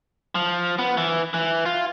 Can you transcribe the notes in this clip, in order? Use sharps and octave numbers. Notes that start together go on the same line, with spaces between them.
F3
B3
E3
E3
F4